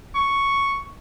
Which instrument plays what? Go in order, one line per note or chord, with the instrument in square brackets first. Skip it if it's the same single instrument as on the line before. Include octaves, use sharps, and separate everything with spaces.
[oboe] C#6